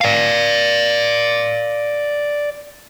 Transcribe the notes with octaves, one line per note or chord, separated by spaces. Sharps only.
D5 F5